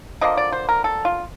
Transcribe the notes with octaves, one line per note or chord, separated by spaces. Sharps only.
D3 F3 A#3 D#5
D5
C5
A#4
A4
F4